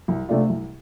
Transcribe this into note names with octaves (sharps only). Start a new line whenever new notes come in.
C2
C3 A3 D4 F4
C2